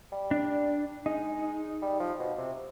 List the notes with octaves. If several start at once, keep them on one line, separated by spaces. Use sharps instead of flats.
G3
D4
G#3 D#4
G3
F3
B2
C3